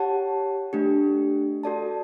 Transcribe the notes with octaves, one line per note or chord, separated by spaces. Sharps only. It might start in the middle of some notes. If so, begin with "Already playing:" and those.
Already playing: G4 C#5 F#5 A5
A3 D4 G4
F#4 A4 D5 A5